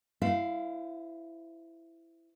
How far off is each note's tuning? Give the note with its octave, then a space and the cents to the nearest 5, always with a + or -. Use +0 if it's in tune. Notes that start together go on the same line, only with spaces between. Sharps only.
E4 +10 C5 -30 F5 +0